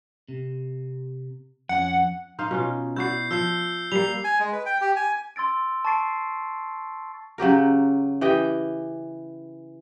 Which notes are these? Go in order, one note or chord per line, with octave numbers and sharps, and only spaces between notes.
C3
F2 C#4 F#5
D#4 C5 F5
B2 C#4 F4
E4 F#4 D5 G6 C7
F3 E6 G6 C7
G3 A#3 C7 F7
G#5
G#3
B4
G5
G4
G#5
C6 E6 A6 D7
A5 C#6 A6 C7 D7
C#3 F#3 G4 A#4
E3 G4 D#5 G5